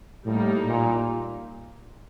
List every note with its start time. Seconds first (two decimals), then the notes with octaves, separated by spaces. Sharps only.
0.26 A2 G3 A#3 D#4
0.67 A#2